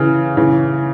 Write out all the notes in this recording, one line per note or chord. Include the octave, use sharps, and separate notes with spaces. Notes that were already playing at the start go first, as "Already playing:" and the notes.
Already playing: C#3 E3
C#3 E3